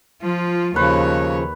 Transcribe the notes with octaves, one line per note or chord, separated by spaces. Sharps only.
F3 F4
D#2 C#3 F3 B4 C#5